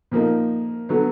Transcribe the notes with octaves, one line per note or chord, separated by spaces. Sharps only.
A#2 F3 A#3 D#4
D3 F#3 B3